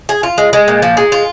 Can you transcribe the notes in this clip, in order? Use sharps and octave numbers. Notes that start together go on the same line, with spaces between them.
G#4
F4
G#3
G#3
A#2
F3
G#3
F4